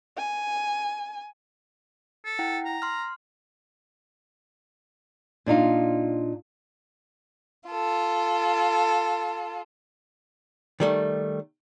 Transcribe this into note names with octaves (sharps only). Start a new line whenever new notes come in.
G#5
A4
E4 F#5 G5
A#5
C6 F6
A#2 D4 D#4 F4
F4 A4
D#3 G3 A3